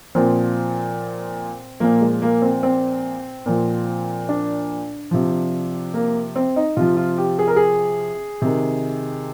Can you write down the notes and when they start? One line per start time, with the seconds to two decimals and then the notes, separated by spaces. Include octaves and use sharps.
0.15 A#2 F3 C4
1.80 A#2 F3 A#3
2.01 G#3
2.22 A#3
2.42 C4
2.63 C4
3.46 A#2 F3
4.29 D4
5.11 C3 F3
5.94 A#3
6.36 C4
6.56 D#4
6.77 C3 F3 F4
6.97 F4
7.18 G4
7.39 G#4
7.47 A#4
7.56 G#4
8.42 C3 D#3